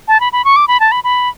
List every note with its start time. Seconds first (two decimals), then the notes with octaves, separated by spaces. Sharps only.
0.08 A5
0.20 B5
0.33 B5
0.45 C#6
0.56 D6
0.68 B5
0.80 A5
0.92 B5
1.04 B5